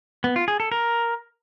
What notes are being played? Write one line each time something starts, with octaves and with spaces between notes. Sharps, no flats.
B3
F4
G#4
A4
A#4